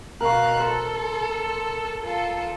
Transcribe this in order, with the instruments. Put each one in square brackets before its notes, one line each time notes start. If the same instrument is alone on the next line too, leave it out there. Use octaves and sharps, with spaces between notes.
[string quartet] B2 F5 F#6 [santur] A#4 C#6
[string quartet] A4 [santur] C5
[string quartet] F4 A4